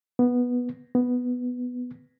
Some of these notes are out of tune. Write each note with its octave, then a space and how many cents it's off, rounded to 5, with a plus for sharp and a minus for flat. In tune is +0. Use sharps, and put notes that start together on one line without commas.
B3 -5
B3 +5